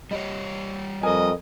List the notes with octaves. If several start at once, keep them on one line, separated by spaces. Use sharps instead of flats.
G3 G4 C#5 D#5
F2 A#4 D#5 G#5